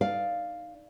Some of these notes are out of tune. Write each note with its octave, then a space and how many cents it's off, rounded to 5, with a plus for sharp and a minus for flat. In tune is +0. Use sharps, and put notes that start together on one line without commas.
D#4 +0 D5 +0 F5 +0